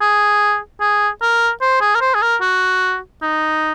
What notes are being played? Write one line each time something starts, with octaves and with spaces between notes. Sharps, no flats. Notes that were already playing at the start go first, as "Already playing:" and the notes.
G#4
G#4
A#4
C5
G#4
A#4
C5
G#4
A#4
F#4
D#4